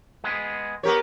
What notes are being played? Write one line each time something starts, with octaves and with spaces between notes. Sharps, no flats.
G#3 B3 G#4
B3 G4 A#4 C#5